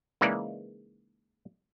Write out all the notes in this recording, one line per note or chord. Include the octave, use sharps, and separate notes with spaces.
C#3 E3 G#3 A#3 D#4 D5